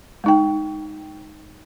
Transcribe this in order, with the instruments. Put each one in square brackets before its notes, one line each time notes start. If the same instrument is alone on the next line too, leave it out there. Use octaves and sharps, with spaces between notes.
[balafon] G#3 D#4 G5